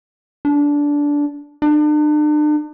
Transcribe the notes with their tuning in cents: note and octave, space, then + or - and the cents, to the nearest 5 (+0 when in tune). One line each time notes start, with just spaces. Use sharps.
D4 -15
D4 +40